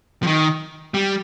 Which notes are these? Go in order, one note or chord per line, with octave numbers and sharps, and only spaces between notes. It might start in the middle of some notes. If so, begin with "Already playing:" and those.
F3
D#3
G3